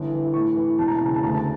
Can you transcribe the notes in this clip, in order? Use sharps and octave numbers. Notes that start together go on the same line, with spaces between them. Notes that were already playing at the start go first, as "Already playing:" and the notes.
Already playing: G1 E3
E3
A2 C#6
E3
E1 A5
A#5
A5
C#3 A#5
A5
D2 A#5
A5